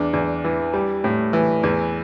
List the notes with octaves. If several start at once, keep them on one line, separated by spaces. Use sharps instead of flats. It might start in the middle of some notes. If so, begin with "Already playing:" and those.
Already playing: E2 D4
E2
E3
G3
A2
E3
E2